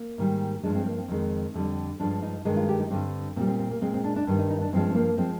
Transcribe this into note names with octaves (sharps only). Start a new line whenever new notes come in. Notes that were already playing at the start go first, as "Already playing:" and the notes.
Already playing: A#3
G#2 D#3 G3
G2 F3 G#3 D4
C4
A#3
C4
F2 D#3 G#3
F2 D3 G3
G2 F3 G#3 D4
D#4
G2 D#3 G#3 D#4
F4
G4
D#4
G2 D3 G3 C4
A#2 G3 C4
C4
C4
A#3
A#2 G#3 C4
C4
D4
D4
G2 D#3 G3 D4
D#4
D#4
D4
G2 F3 G#3 C4
C4
A#3
F3 G#3 C4